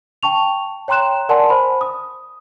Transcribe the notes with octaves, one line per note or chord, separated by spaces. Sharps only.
G5 A5 C#6 F7
C#5 G5 A#5 C6 F#6 E7
A#4 D5 F#5 G#5 A5 C6
C5 B5
D#6